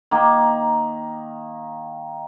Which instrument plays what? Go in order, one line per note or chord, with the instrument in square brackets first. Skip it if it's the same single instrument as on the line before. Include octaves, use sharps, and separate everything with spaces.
[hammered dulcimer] D#3 A#3